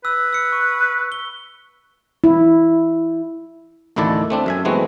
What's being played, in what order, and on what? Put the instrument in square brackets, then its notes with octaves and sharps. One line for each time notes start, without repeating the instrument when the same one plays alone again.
[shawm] B4 [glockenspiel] E6
[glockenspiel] E6 C#7
C#6
G7
[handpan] E4
[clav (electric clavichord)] A1 D2 D#3 E4 A4 D5
A3 C4 D4
F#2 E5 G#5
E3 G#3 A3 B3 C4 F#4